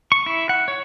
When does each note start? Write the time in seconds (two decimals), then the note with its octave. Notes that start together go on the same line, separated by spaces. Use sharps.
0.12 C#6
0.26 E4
0.49 F#5
0.68 C#5